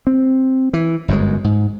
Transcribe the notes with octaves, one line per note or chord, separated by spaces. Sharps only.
C4
E3
G1 F#2 C3 G#3
G#2